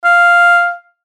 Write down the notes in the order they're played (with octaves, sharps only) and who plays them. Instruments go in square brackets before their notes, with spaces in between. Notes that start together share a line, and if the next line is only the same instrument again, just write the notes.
[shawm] F5